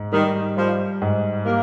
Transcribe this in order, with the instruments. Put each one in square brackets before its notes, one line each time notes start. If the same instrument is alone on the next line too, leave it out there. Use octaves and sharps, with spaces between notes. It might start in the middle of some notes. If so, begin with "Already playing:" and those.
Already playing: [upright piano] G#2
[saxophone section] D#3 [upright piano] G3
[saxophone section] F3 [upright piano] G3
[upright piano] G#2
[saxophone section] A#3 [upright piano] G4